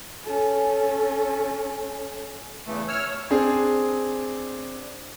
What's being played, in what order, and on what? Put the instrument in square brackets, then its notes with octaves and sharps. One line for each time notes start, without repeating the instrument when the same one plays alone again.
[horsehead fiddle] C#4 A4
[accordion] E2 C#3 E3 [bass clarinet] A3
[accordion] C#5 E6 F6
[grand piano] C4 D4 G#4